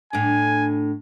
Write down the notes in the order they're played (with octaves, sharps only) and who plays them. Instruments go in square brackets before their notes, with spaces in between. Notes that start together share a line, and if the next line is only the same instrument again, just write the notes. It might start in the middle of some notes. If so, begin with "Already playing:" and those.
[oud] A2 D4 [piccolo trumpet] G#5